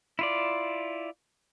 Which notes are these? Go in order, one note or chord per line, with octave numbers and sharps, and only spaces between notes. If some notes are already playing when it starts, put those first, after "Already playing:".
E4 F4 D5